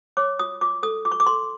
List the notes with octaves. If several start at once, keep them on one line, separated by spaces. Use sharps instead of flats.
C#5 D6
F4 D#6
F4 D6
A4 D#6
F4 D6
C#6
D6
A4 C6